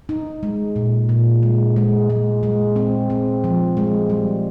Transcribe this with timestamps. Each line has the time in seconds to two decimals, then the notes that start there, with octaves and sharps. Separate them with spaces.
0.09 D#4
0.43 G#3
0.76 A#2
1.09 A#2
1.43 G#3
1.76 G#3
2.10 G#3
2.43 G#3
2.76 C4
3.10 C4
3.44 F3
3.77 G#3
4.10 G3